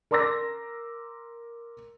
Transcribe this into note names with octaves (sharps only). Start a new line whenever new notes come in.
A#4 A#5 C6 D6 E6 A#6